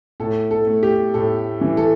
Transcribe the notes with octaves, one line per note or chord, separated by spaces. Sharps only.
A2 A4
A4
A3
G4
A2 A4
E3
A4